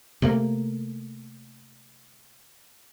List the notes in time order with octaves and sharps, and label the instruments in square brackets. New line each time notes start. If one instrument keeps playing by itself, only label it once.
[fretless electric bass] C3 A3 A#3